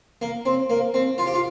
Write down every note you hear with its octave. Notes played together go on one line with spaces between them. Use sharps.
A#3
C4
A#3
C4
F4
G4
F4